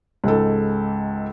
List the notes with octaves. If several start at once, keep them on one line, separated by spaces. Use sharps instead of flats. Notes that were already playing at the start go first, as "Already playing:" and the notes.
C#2 G#2 A4